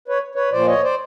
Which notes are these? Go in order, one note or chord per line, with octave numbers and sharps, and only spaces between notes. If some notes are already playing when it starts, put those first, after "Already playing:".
B4 C#5
B4 C#5
A#2 F3 C5 D5
C#5 D#5
C5 D5